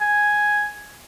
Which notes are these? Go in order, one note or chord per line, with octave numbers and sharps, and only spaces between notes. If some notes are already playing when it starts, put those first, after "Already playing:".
G#5